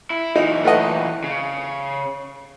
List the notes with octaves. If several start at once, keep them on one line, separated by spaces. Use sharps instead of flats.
E4
A#2 E3 D#4
A3 B4 D#5
C#3